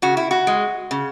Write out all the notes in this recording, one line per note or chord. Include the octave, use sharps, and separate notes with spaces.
C#3 F#4
E4
F#4
G#3
C#3